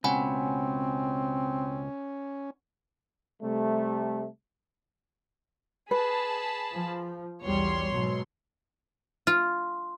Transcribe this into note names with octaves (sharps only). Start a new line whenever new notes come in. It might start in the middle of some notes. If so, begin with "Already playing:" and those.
C#2 B2 C4 C#4 F#5 G#5 B5
C3 G3 A3
G#4 B4 A5 B5
F3
B1 E2 G3 C#5 C6
G#2 B2 F#3
F4